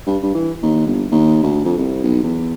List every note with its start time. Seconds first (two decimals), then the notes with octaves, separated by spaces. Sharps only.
0.07 G2
0.23 G2
0.35 E3
0.63 D#2
0.86 G1
1.12 D#2
1.43 D2
1.65 F2
1.78 C2
2.03 B1
2.23 E2